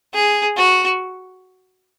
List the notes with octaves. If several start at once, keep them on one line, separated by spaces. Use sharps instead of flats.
G#4
F#4